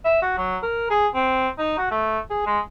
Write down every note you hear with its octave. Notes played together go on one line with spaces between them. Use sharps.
E5
F#4
F#3
A#4
G#4
C4
D#4
F#4
A3
G#4
G#3